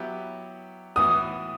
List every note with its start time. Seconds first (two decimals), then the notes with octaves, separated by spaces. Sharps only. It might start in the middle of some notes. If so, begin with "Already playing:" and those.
Already playing: F#3 B3 E4 G4
0.96 A2 E3 B3 F#4 D#6